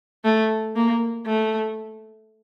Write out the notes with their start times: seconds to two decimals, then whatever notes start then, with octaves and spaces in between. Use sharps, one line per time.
0.24 A3
0.76 A#3
1.26 A3